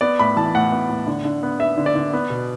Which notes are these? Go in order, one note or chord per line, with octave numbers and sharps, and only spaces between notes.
B3 D5
A2 B5
E3 A5
A2 F#5
B3
A2
D3
D3
B3
B3 E5
D3
D5
D3
B3
B2